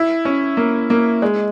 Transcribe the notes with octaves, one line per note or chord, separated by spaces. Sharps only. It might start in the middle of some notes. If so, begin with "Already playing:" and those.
Already playing: E4
C#4
A#3
A#3
G#3